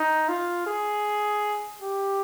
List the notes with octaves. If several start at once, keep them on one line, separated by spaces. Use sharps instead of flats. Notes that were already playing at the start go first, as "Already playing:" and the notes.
Already playing: D#4
F4
G#4
G4